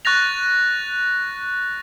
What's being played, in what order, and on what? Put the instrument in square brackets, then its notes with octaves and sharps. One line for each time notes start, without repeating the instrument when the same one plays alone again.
[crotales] C#6 F#6 A6 A#6 F7